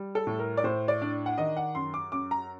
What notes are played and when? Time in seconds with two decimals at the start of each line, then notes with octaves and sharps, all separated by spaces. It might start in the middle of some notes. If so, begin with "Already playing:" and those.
Already playing: G3
0.15 A4
0.27 A2
0.39 A#4
0.57 D5
0.64 A2 C5
0.88 D5
1.02 D4
1.26 F#5
1.38 D#3 D#5
1.57 F#5
1.75 F#2 C6
1.94 D6
2.12 F#2 D6
2.31 A#5